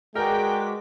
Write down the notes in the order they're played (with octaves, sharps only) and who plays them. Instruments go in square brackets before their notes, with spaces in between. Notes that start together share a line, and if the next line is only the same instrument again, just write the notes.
[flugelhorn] G#3 [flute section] F#4 B4 D6 [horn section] G#4 D5 G5 [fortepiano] A#4